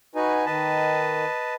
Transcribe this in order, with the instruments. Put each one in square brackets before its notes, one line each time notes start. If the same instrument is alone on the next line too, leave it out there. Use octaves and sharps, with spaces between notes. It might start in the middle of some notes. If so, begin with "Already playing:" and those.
[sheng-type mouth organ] D#4 [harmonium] F#4 B4 G#5
[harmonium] D#3 [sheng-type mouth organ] B4 D#5 A5